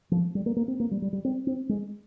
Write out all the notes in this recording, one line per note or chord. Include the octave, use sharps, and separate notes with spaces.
F3
G3
A#3
A#3
C4
A#3
G3
G3
G3
C4
C4
G#3